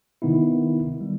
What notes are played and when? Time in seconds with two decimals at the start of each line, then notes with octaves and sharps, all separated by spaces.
0.22 C3 D#3 B3 D#4 E4
1.01 G3